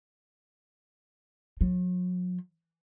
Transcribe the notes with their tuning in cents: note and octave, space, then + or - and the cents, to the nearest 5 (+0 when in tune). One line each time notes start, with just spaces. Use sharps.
F#3 -40